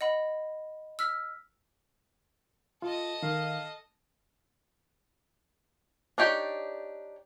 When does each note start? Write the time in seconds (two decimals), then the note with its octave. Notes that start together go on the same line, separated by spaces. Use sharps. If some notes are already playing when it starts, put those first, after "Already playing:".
0.01 D#5 F#5 B5
0.99 E6 F6 B6
2.82 F4 A4 D#5
3.23 D#3 F5
6.18 D4 D#4 G4 C#5 G5